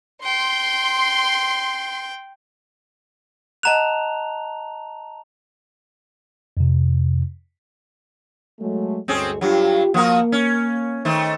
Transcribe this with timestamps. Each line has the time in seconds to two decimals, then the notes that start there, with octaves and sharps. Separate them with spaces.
0.24 G5 C6
3.63 D#5 F#5 A5 A#5 F#6 F7
6.57 F2 C3
8.60 F#3 G#3 A3
9.08 D2 G2 G#3 C4 C#4 G#4
9.41 G2 F#3 F4 G4
9.94 F3 A#3 F#4 A#4
10.32 C#4
11.05 D#3 A3 C5